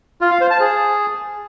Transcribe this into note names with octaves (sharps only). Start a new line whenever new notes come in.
F4
F5
C5
A5
G#4